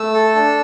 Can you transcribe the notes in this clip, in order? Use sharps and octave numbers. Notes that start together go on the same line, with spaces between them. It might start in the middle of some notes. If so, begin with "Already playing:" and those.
Already playing: A3 E6
A4
D4